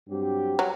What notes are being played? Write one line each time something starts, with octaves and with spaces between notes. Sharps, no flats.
G2 F#3 C4 G4
F#3